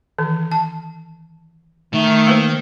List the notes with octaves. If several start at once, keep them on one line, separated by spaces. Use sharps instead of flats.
D#3 E3
A5
D#3 A3
A#3 B4 C5